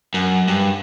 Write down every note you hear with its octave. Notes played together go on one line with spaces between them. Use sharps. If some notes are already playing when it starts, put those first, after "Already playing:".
F#2
G2